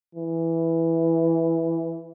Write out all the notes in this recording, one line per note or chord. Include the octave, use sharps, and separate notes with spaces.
E3